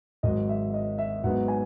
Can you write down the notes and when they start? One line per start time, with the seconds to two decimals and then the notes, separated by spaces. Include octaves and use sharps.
0.23 G#1 G#2 F#3 D#5
0.49 E5
0.74 D#5
0.98 E5
1.24 G#2 F#3 B3 D#4 F#5
1.48 G#5